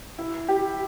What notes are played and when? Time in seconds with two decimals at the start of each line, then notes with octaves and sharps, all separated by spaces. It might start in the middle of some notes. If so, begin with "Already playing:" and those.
0.18 E4
0.48 G4